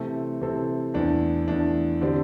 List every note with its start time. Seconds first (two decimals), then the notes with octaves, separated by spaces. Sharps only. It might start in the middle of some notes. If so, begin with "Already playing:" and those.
Already playing: C3 E3 A3 C4 A4
0.41 C3 E3 A3 C4 A4
0.94 E2 E3 A3 D4
1.48 E2 E3 A3 D4
2.01 D3 C4 G4 D5